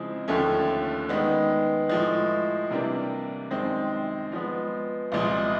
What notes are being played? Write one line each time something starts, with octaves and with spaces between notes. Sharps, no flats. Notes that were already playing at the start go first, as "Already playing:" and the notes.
Already playing: C#3 F3 G#3 C4 E4
D#2 D3 F3 A3 C#4
D#3 G#3 B3
A2 F3 G#3
C3 E3 G3 A#3 D4
F#2 D#3 G#3 C4
F3 G#3 B3
C2 A#2 F3 G#3